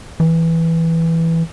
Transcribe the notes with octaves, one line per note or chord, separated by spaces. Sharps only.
E3